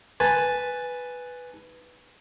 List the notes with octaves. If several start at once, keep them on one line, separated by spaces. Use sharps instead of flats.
B4 G#5 A5